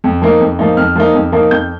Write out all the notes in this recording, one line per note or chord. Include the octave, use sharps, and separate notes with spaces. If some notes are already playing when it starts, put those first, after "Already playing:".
F2
F3 A#3 D#4
F2
F3 A#3 D#4
F2 F6
F3 A#3 D#4
F2
F3 A#3 D#4
F2 G6